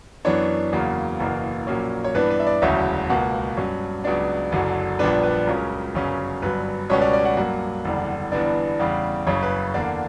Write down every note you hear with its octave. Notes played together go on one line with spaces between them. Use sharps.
F#2 E3 B3 D4 C#5
E2 C#3 F#3 A#3
F#1 E2 B2 A#3 A#4
A#1 A#2 F#3 A#3 C#4
C#5
G2 E3 B3 D4 B4
B4
E5
D5
E1 D2 C#3 F#3 C#4 E5
C#2 B2 A#3 F#5
G2 F#3 C#4
C#2 C#3 F#3 B3 D4 D5
F#1 F#2 D3 F#3
A#1 A#2 G3 B3 D4 B4
B4
C#2 C#3 F#3 C#4 A#4
G1 F#2 C#3 F#3 C#4
G1 G2 F#3 B4
C#2 B2 G3 C#4 C#5
D5
D5
F#5
G2 F#3 A#3 F#5
F#1 E2 D3 G3
G1 G2 E3 B3 D4 D5
E2 C#3 G3
F#1 F#2 C#3 C#5
B4
E2 D3 A#3 D4 D5